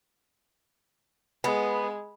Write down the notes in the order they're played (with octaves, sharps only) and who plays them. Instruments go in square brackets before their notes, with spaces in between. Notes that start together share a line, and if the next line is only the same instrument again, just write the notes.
[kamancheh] G#3 [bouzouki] B3